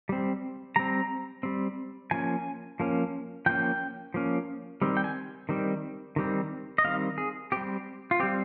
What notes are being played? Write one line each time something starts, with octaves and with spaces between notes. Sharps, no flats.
G3 C4
G3 C4 A#5
G3 C4
F3 A#3 C#4 G#5
F3 A#3 C#4
F3 A#3 C#4 G5
F3 A#3 C#4
D#3 G3 C4
G5
G#5
D#3 G3 C4
D#3 G3 C4
D#5
D#3 G3 C4 F5
G#4
G3 C4 G4
F4
G3 C4 G4